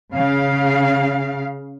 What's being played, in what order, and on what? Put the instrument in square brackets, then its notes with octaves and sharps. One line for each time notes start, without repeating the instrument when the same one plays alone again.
[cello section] C#3 F5